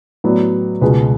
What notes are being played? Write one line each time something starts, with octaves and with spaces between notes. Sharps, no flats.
A2 F#3 B3 D5
C#2 B2 G#3 B4